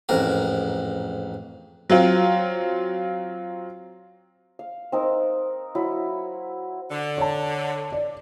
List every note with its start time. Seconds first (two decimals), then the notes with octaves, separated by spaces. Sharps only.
0.09 A1 F2 G#2 A#4
1.90 F#3 C4 F4
4.59 F5
4.92 C4 D#4 A#4
5.75 F#3 E4
6.91 D3
7.17 C#5 A5
7.92 D5